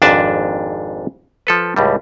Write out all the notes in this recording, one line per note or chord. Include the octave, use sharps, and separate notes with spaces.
G#1 F2 G#2 D4 B4 A5
F3 A4 B4
C#2 A2 G3